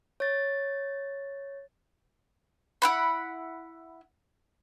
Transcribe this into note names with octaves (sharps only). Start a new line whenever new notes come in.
C#5 A6
E4 F#5 B5